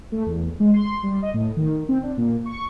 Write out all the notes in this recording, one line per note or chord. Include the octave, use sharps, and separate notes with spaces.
A3
E2
G#3
C6
G3
D#5
A2
D#3
C4
D4
A#2
C#6